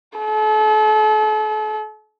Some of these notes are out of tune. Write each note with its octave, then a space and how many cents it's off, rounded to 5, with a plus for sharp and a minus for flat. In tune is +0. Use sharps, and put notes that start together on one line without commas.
A4 -40